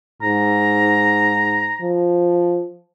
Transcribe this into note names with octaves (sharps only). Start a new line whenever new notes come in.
G#2 A#5
F3